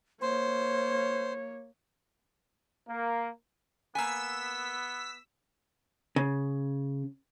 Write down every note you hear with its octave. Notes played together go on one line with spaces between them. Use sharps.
A#3 C5 C#5
A#3
A#3 B3 G#5 E6 B6
C#3